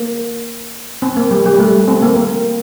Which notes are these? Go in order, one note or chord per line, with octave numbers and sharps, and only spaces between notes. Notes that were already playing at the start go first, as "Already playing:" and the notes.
Already playing: A#3
C4
A#3
G3
G3
A3
C4
A#3
A#3